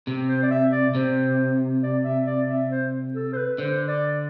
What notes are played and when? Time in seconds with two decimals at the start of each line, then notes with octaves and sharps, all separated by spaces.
0.07 C3
0.29 C5
0.43 D5
0.51 E5
0.72 D5
0.95 C3 C5
1.83 D5
2.05 E5
2.27 D5
2.49 E5
2.71 C5
3.14 A4
3.33 C5
3.37 B4
3.58 D3 C5
3.88 D5